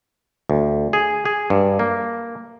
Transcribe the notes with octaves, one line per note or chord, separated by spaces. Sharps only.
D2
G#4
G#4
G2
A#3